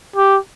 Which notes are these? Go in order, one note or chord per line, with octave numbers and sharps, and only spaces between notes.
G4